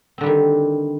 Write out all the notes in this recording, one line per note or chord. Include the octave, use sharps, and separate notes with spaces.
D3 D#3 G3 C4